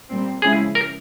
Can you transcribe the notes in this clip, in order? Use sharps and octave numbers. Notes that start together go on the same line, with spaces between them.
A#2 G3 C4
C#3 F3 G#3 E4 G#4
A#4